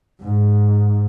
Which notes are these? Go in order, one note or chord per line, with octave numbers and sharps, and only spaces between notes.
G#2